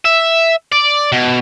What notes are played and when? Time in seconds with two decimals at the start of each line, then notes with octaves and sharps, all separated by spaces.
0.05 E5
0.72 D5
1.12 B2